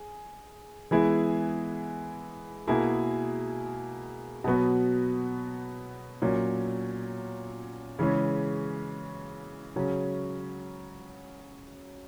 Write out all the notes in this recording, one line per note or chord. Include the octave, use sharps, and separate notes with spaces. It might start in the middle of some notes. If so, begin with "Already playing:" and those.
Already playing: G#4
E3 G#3 B3 E4 G#4
B2 A#3 E4 G#4
B2 F#3 B3 F#4
A#2 F#3 C#4
C#3 E3 G#3 C#4
C#3 F#3 C#4